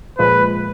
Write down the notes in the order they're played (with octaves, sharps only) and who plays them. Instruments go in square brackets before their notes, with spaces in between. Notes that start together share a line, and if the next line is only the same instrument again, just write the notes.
[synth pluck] A#2 F3 G#3 [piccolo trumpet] B4